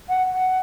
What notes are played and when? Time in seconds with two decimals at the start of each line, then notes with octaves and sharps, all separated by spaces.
0.09 F#5
0.32 F#5